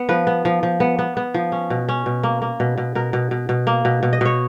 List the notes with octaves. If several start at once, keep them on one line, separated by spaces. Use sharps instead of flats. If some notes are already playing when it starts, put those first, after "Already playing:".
Already playing: B3
F3 B4
B3
F3
F3
B3
B3
B3
F3
C#4
B2
C#4
B2
A#3
A#3
B2
B2
B2 A#4
B2
B2
B2
A#3
B2
B2
D#5
B2 C#5